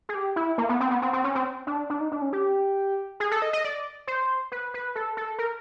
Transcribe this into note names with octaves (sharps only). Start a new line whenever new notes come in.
G#4
G4
E4
A#3
B3
C4
B3
C4
C4
C#4
C4
D4
D4
D#4
D4
C#4
G4
G#4
A4
D#5
D#5
D5
C5
B4
B4
A4
A4
A#4